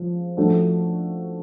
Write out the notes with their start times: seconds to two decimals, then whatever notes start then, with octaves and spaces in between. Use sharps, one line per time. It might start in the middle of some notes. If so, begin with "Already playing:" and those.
Already playing: F3 G#3 F4
0.37 F3 A3 D4 F#4